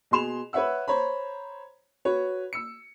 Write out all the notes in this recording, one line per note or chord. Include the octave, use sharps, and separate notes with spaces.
B2 G#4 C6 E7 F7
B4 C#5 E5 F#5 E6
C5 C#5 A#5 B5
F#4 B4 C#5
E6 C#7